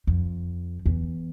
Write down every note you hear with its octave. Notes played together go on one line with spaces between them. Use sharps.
F2
E2